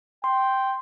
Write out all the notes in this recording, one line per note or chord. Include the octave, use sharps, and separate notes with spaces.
G5 C6